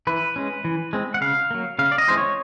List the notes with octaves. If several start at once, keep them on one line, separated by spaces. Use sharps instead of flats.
E3 B4
G#3 C#4
E3
G#3 C4
F#5
C#3 F5
F#3 A#3
C#3 F5
D5
D#5
E3 G#3 C4 C5
C#5